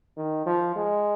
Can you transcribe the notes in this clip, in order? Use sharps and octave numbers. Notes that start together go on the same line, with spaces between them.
D#3
F3
G#3